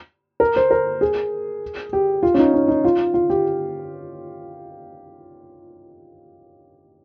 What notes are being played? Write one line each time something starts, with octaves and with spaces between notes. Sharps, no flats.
A#4
C5
A#4
G#4
G4
F4
C#4
D#4
C#4
D#4
F4
F4
G4